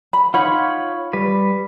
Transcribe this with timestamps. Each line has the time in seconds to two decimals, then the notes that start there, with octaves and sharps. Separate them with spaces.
0.13 B5
0.34 D#4 F4 C#5 F#5 B5
1.13 G3 B4